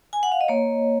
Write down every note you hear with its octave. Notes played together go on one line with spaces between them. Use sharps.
G#5
F#5
F5
D#5
A#3 C#5